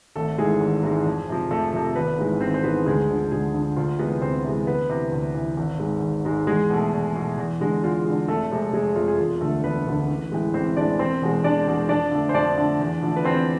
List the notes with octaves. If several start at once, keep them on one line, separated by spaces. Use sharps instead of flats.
G#1 A3 A4
G#2 E3 G#3 G#4
G#1
G#2 E3 G#3
F2
C3 F3
F2 A3 A4
C3 F3
A4
G#1 B3 B4
G#2 E3 G#3
G#1 C4 C5
C5
G#2 E3 G#3 B3 B4
D2 G#3 G#4
D3 F3
D2 G#3 G#4
D3 F3
D2 F4
C3 E3 G#3 B3 B4
D2 C4 C5
C3 E3 G#3
D2 B3 B4
C3 E3
D2
C3 E3
G#1
G#2 G#3
G#1
G#2 G#3
E2 G#3 G#4
B2 A3
E2
B2 A3
E2
D3 G#3
E2 F4
D3 G#3
F1 A3 A4
F2 C3 G#3
F1 G#3 G#4
F2 C3 G#3 F4
G#4
E1 F4
D2 D3 A3 A4
E1 B3 B4
D2 D3
A1
A2 E3 G#3
A1 C4 C5
A2 E3 G#3 D4 D5
E1 C4 C5
E2 B2 G#3
E1 D4 D5
E2 B2 G#3
F2 D4 D5
D3 A3
C5
F2 D4 D5
D3 A3
E2
D3 F3 A3
B4
E2 C4 C5